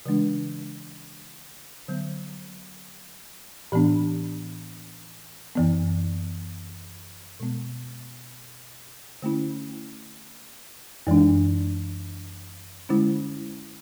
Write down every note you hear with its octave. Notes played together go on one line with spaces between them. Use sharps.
C#3 E3 G#3 D4
D3 F#3 B3
A2 E3 B3 D4
F#2 E3 B3
B2 G#3 B3
D3 A3 C#4 E4
F#2 E3 G#3 D4
D3 G#3 C#4 E4